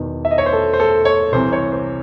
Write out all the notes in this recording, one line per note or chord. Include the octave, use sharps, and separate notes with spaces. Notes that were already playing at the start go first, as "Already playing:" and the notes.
Already playing: E1 E2 D#3
E5
D#5
C#5
C5
A4
C5
A4
C#5
C2 C3 E3 C5
C#5
C5